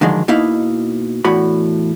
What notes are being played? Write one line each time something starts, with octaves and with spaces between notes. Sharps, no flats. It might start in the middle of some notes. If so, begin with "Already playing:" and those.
D3 D#3 F3 F#3 G#3
B2 A#3 D#4 E4 F5
E2 A2 F#4 B5